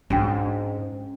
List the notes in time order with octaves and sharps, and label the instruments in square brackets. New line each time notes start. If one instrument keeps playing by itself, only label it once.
[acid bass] G#2 [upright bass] C#4 D4 [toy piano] F#4 G5